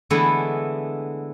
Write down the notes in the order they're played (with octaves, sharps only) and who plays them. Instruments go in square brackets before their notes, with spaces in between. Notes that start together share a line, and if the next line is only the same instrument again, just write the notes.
[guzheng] D3 E3 G#3 A3 B3 E4